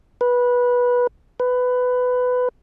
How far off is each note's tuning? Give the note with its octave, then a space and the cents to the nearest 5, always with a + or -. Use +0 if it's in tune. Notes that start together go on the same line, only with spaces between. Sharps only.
B4 -15
B4 +15